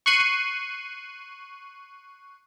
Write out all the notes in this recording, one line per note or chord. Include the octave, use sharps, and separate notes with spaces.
C#6 F#6 C7 D#7